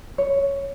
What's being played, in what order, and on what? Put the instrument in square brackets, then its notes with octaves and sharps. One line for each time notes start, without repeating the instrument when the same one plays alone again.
[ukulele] C#5